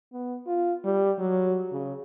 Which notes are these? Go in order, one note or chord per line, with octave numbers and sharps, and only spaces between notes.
B3
F4
G3
F#3
C#3